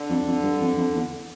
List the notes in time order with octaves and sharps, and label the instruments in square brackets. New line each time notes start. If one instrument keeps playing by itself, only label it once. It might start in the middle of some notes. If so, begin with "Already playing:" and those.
Already playing: [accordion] D3
[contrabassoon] F2
F2
G2
F2
F2
E2